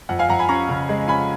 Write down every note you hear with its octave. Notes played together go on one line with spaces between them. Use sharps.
F2 F#5
F5 G#5
F2 F#5 A#5
G#5 B5
C#4 A#5 C#6
C#3
G#3
C#4 G#5 B5